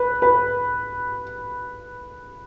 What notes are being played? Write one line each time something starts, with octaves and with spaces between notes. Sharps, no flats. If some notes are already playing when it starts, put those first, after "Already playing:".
Already playing: B4
B4